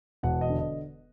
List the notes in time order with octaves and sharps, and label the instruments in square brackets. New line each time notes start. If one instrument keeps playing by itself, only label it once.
[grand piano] E1 F#5
D#5
D3
D#5